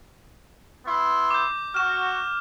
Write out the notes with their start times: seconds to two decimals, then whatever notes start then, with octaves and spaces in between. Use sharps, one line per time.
0.86 B3 E4 C6
1.31 D6 G6
1.74 F#4 F6 E7